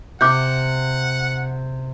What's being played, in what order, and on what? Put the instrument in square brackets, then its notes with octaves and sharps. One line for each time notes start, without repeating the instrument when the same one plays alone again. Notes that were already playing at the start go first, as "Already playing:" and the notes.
[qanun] C3 [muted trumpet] F#5 [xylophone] D6 F#6 G6